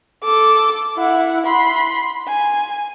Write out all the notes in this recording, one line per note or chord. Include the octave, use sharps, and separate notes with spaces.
A4 D6
E4 F#5
B5 C6
G#5